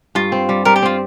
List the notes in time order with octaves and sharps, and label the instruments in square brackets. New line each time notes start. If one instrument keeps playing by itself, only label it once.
[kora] G2 [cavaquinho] F4
[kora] C4
G3
[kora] G3 [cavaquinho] A#4
[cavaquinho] G4
[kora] C4 [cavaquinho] F4